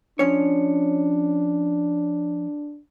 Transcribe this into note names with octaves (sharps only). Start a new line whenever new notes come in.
F3 C#4 D4 C#5